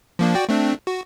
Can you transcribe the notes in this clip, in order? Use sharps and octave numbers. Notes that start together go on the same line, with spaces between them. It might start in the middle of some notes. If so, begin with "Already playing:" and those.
F3 A#3 D4
F#4 D5 G5
A3 C4 D4
F#4